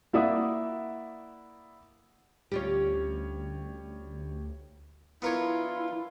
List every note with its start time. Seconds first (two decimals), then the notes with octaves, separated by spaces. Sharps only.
0.13 A#3 E4 D5 E5 F#5 D#6
2.52 D2 G3 C#4 F4 G4 C#5
5.22 F3 B3 D4 E4 F4 A#4 C#5